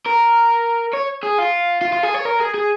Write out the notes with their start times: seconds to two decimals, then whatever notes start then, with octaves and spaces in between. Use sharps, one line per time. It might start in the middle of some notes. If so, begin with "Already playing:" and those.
0.06 A#4
0.93 C#5
1.23 G#4
1.38 F4
1.81 F4
1.93 F4
2.03 G#4
2.14 C#5
2.25 A#4
2.40 G#4
2.54 G#4